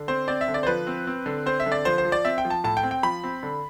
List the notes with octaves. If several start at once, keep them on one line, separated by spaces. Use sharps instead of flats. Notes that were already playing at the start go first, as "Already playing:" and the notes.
Already playing: D3
C4 C5
C4 D5
E5
D3
D5
C5
F3 B4
C4
C4
D3
C4 C5
E5
D3
D5
F3 C5
C5
F3
D5
C4 E5
G5
F3
A5
A2 A5
G5
C4
G5
F3 B5
C4
D3